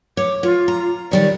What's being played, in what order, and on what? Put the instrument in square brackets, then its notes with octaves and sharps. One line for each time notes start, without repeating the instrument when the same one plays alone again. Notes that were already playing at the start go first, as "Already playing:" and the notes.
[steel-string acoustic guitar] C#5 [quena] D6
[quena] F4 [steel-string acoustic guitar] C#5
[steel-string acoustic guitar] A#5
[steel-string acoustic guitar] D#3 G3 C#5 [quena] D5